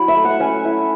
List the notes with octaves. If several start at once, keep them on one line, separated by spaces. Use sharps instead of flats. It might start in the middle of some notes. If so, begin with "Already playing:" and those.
Already playing: F#3 E4 B5
E5
A3
F#5
C#4 G#5
E4